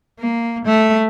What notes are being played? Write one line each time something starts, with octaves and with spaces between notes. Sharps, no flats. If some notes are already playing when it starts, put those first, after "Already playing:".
A#3
A3